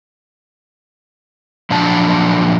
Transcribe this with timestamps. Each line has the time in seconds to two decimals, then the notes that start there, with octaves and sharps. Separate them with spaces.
1.71 A#2 F3 F#3 D4 A5